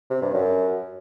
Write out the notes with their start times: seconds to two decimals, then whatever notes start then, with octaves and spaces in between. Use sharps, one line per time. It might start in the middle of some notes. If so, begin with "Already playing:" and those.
0.10 C3
0.22 G2
0.34 F#2